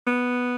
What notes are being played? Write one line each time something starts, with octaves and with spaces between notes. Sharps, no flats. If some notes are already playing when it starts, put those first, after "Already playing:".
B3